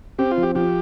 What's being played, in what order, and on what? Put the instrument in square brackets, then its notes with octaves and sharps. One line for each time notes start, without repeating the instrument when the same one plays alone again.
[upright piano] C4 [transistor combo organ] G4
[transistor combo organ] F4
[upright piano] F3
[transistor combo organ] G4
[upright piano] F3 [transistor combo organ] G4